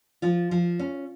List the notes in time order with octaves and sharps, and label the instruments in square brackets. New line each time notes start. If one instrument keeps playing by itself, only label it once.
[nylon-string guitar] F3 F4
F3
C#4